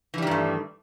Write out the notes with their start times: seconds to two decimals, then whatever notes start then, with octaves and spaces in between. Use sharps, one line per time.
0.14 E3
0.18 G3
0.22 D#3
0.27 G2
0.31 A3